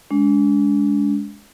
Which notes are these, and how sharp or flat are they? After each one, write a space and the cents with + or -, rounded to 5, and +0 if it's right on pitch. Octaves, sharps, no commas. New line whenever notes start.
G#3 +0 D4 -40